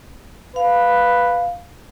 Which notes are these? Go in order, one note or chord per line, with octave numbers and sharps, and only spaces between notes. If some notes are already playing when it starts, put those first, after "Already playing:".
B4 F5